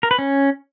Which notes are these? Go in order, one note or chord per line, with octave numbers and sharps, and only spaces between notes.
A#4
B4
C#4